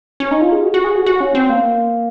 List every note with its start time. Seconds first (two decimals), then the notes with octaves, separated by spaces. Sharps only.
0.20 C#4
0.31 D#4
0.41 F4
0.52 G#4
0.63 F#4
0.74 F#4
0.84 G#4
0.96 F#4
1.06 F#4
1.20 C#4
1.35 C4
1.50 A#3